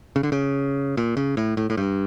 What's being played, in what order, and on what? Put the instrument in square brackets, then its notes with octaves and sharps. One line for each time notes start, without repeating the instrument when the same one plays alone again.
[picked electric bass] C#3
D3
C#3
A#2
C#3
A2
A2
A2
G2